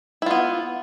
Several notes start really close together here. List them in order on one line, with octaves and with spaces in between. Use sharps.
E4 F4 B3